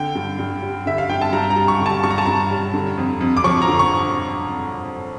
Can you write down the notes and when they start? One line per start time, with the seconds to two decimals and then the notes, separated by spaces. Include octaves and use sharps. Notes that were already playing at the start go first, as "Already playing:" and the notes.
Already playing: D3 G5
0.15 G2
0.39 G2
0.62 G3
0.86 D3 E5
0.98 F5
1.09 G2 G5
1.21 A5
1.33 G2 A#5
1.50 A#5
1.56 G3
1.68 C#6
1.80 D3
1.86 A5
2.03 G2 C#6
2.11 A#5
2.18 A5
2.25 G2 A#5
2.51 G3
2.74 D3
2.97 F2
3.21 F2
3.37 D6
3.44 F3 C#6
3.62 A#5
3.68 D3
3.79 C#6